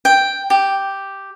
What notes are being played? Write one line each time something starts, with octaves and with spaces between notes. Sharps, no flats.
G5
G4